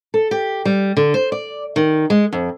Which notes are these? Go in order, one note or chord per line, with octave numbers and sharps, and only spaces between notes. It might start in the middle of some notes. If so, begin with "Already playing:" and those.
A4
G4
G3
D3
C5
D5
D#3
G#3
F2